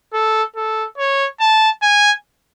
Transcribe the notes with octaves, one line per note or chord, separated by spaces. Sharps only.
A4
A4
C#5
A5
G#5